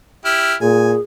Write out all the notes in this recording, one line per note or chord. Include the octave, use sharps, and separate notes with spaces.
E4 G4 F6
A#2 G#4 G#5